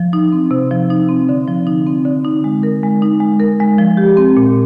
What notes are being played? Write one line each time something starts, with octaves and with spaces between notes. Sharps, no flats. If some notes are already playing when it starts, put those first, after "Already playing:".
Already playing: F3
D#4
C4
C3
F3
D#4
C4
D3
F3
D#4
C4
D3
D#4
G#3
A#4
G#3
D#4
G#3
A#4
G#3
F3
G4
C4
A#2